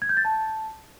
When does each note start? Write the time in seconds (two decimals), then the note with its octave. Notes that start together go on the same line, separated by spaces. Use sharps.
0.02 G#6
0.09 G6
0.17 A6
0.25 A5